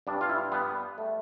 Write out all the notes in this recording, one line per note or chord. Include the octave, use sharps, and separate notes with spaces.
G2 D4
F4
E4
G3 B3
A3